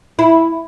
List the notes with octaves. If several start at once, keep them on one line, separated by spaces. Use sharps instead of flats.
E4